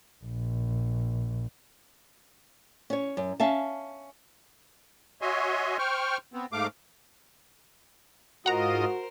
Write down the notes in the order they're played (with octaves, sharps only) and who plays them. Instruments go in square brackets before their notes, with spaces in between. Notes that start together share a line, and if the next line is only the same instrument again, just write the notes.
[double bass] A#1
[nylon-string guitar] C#4 C#5
F#2
C#4 E5 F5 A5
[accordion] F#4 C#5 D#5 E5 G#5 C6
C5 G5 C#6 F6
B3 C4
G#2 A3 F5 D6
[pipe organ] G#2 F4 D#5 [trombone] F#4 [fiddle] A#4 C5 [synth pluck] F#5 A#5